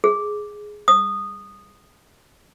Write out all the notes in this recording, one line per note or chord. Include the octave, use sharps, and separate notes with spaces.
G#4
D#6